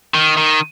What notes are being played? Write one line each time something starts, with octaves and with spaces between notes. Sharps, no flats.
D#3
D#3